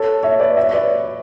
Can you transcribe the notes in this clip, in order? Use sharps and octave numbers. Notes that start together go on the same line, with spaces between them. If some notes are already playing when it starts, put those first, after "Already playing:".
Already playing: A4 C#5
C#5 E5
B4 D5
C#5 E5
C#5
B4 D5